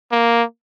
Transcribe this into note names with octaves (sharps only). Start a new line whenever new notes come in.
A#3